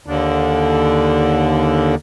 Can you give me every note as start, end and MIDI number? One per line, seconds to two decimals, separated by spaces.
0.06 1.95 39
0.06 1.95 50